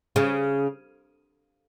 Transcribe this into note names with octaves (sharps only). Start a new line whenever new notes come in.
C#3